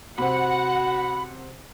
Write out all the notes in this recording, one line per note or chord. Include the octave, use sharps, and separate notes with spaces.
C3 C4 F#4 C5 F#5 B5